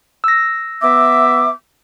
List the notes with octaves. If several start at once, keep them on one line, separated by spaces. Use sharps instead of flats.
E6 A#6
B3 E5 D6